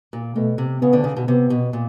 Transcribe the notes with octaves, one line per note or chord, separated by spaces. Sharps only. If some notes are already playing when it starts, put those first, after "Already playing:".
A#2
B2 A3
C3
C#3 B3
D2 D3
C#3
B2
C3 B3
B2
A#2